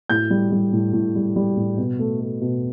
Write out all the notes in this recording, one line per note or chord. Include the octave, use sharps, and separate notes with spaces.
A2 G6
G3
G3
A2
A2
G3
G3
A2
B2
A3
A3
B2